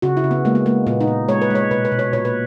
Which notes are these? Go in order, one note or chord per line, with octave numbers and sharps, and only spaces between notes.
C#3 F#4
E4
C#3
B3
G#3 A#3
B3
G#3 A#3
A#2 B3
D#4
A#2
G#3 C#5
B4
G#3 C#5
B2 B4
B4
B2
C#5
A#2 C#5
B4